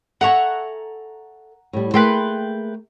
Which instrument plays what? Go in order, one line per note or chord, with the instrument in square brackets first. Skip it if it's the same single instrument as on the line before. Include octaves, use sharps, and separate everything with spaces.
[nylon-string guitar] A4 E5 G#5 [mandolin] F#5 A#5 C#6
[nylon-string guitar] A2 G3
[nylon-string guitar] A3 A#3 G#4 [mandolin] B4 G5 C6